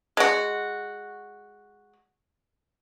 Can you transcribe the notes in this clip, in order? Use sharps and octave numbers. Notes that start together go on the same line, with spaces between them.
G#3 F#4